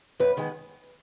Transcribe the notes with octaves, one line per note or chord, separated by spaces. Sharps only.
F#2 B4
D#3 G#3 B3